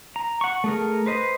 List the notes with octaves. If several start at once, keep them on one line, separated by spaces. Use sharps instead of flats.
A#5
F#5 C#6
A3 G#4 A#4
B4 C5 D#5